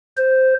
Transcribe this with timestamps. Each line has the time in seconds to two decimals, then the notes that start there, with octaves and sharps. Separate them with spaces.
0.17 C5